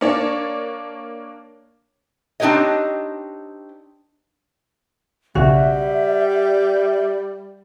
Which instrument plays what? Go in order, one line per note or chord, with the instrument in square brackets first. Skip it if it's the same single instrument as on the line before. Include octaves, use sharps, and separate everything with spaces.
[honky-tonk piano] A#3 D4 C#5 D5 A5
[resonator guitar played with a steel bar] C4 D4 D#4 G4 C#5 D#5
[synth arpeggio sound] B1 C#3 [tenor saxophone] G3 [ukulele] F#4 [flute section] E5